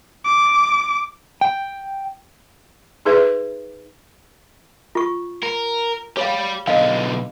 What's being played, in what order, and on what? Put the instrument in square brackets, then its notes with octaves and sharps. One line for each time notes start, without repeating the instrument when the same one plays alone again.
[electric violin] D6
[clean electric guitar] G5
[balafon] D#4 G#4 B4 E5
[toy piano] F4 C#6
[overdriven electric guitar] A#4
[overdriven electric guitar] G4 B5 [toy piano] C#5 F5
[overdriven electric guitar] B1 D3 [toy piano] D#5 F5